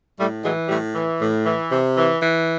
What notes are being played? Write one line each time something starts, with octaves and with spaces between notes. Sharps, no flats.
A2 G3 A3
E3 F#3 G#3
A2 G3 A3
E3
A2
E3
C3
E3
E3